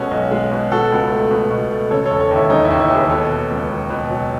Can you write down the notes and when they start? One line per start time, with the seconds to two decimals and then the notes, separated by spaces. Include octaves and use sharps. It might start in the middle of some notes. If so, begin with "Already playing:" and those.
Already playing: B2 G#3 C#4 F#4 A4
0.11 B1
0.31 G#3
0.51 B2
0.71 B2 F#4 A4
0.92 C#2
1.11 A3
1.30 B2
1.51 B2
1.71 A3
1.91 C#3 A4 C#5
2.06 A4 C#5
2.10 E1
2.20 A4 C#5
2.31 D#2
2.36 E4
2.50 E1 D#4
2.65 E4
2.70 D#2
2.80 E4
2.90 D#2 G#4 B4
3.10 B2 A4 C#5
3.31 B2
3.50 C#2
3.70 B2
3.90 B2
4.10 F#3